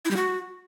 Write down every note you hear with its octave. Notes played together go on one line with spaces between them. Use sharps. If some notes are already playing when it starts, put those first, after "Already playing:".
E4
G3
F#4